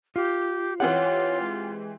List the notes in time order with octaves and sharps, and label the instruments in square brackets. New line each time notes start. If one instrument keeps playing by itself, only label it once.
[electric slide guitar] F4 [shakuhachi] G4
[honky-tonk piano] E3 C4 G4 [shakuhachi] F4 [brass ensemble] C#5 [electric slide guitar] F#5
[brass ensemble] G#3